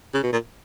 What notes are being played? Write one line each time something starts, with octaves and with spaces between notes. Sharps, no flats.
C#3
B2
A#2